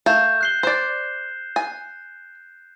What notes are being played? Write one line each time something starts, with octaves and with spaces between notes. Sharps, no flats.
A3 A#4 F5 G6 G#6 E7
F#6 C7 G7
C5 D5 C7 E7
G#5